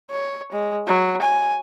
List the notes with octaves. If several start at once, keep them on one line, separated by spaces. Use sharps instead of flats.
C#5
G#3
F#3
G#5